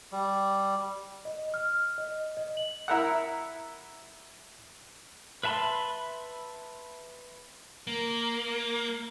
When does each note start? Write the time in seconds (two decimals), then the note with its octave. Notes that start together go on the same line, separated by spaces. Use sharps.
0.12 G3
1.25 D#5
1.54 F6
1.98 D#5
2.37 D#5
2.57 F#7
2.88 E4 A#4 F#5
5.43 B4 E5 A5 B5 C6
7.87 A#3